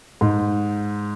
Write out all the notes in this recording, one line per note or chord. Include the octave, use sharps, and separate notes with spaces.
G#2